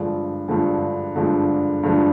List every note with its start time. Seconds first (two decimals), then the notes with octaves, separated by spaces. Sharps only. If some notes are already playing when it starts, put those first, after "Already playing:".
Already playing: G2 D3 F3 G#3
0.48 G2 D3 F3 G#3
1.16 G2 D3 F3 G#3
1.83 G2 D3 F3 G#3